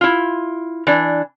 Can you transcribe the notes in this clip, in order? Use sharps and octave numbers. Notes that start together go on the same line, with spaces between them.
E4 F4
E3 D4